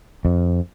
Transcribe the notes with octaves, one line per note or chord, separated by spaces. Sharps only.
F2